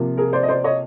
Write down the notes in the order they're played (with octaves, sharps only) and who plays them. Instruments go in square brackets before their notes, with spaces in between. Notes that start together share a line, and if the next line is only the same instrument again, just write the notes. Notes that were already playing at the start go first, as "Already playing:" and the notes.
Already playing: [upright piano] C3 F3 A#3
G#4 A#4
C5 D5
D#5
C5 D5
C#5 D#5